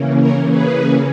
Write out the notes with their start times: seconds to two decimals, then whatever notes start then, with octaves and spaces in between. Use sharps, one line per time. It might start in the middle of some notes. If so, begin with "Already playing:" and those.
Already playing: C#3 E3 A#3 C#4
0.20 A#4 C#5
0.50 G#4 B4